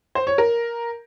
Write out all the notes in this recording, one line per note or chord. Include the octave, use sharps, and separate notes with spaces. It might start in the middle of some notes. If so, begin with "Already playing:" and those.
C5
C#5
A#4